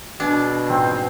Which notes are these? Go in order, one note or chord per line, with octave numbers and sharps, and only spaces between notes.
B2 D4 G#4
G#2 F3 C4 C5